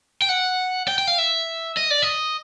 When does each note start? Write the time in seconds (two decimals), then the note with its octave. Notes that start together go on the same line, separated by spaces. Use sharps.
0.22 G5
0.29 F#5
0.88 G5
0.98 G5
1.07 F5
1.18 E5
1.77 D#5
1.91 D5
2.02 D#5